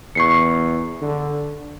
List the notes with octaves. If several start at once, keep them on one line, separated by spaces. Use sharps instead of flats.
E2 C#6 C7 C#7
D3